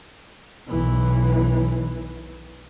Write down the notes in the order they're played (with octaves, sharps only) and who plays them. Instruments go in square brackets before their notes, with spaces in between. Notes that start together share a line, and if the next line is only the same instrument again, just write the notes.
[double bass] B1 E3